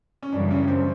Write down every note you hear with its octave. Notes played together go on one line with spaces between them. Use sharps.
C#4
F#2 C#3 E3 G3 D4
C#4
C4